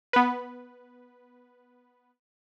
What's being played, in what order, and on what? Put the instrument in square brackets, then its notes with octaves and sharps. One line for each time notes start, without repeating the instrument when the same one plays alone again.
[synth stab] B3 B4